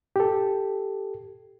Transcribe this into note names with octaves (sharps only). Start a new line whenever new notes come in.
G4 A4